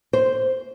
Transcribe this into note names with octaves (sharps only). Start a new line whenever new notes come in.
C5